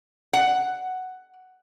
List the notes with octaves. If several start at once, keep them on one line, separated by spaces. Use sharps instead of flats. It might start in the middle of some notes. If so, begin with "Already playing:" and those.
F#5